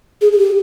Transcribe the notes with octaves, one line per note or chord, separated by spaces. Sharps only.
G#4
G#4
G4